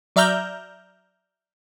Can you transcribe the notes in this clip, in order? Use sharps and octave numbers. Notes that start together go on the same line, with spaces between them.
F#3 D5 E5 A#5 F6 G6